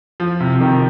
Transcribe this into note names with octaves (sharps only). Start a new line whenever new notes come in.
F3
C3
D#3